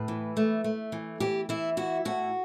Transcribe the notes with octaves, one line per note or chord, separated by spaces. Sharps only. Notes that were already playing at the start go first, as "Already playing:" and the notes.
Already playing: A2 B4
E3
A3
A3
E3
E3 G4
E3 E4
E4 F#4
A2 F#4